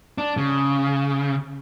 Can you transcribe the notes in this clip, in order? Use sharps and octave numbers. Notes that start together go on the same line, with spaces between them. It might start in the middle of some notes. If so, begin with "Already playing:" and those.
D4
C#3